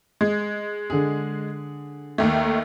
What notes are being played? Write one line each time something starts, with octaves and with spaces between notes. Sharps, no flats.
G#3 G#4
D3 G#4
D#2 D#3 A3